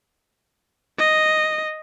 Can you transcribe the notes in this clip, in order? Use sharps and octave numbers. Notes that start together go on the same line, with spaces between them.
D#5